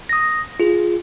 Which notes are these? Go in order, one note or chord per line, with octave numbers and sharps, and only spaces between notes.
D#6 A#6
F4 G#4